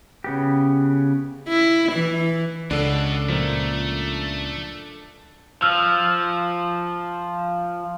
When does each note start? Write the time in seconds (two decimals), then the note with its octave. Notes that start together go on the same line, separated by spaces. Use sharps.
0.24 C#3 B3 G4
1.48 E4
1.92 E3
2.71 C#2 B2 D4 A4
3.29 A#2 F3 A3
5.62 F3 E6 F6